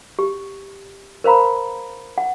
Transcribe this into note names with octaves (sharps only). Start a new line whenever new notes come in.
G4
A#4 C5 F5 A#5 B5
F#5